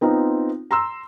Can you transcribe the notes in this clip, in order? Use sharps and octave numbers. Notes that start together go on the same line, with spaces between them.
B3 C4 D#4 F4
A#5 C6 E6